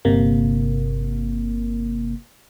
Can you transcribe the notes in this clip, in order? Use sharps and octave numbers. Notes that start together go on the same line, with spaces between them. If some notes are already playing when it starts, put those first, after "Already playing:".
G1 C3 A#3